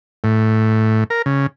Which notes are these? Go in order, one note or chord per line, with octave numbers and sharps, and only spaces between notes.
A2
A#4
C#3